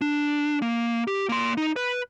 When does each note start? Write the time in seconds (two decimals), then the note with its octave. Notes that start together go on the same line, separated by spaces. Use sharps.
0.01 D4
0.62 A#3
1.07 G4
1.29 A#3 C6
1.57 D#4
1.76 B4